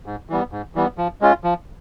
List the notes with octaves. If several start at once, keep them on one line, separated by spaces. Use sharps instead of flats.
G#2
E3 G3 B3
G#2
E3 G3 B3
F3
G#3 C#4 F4
F3